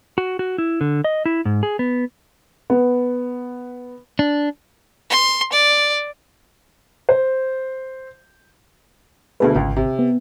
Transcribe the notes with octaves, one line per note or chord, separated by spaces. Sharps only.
F#4
F#4
E4
D3
D#5
E4
G#2
G#4
B3
B3
D4
C6
D5
C5
D2 B2 A3 G#4 B4
G#1 C#2
C3
B3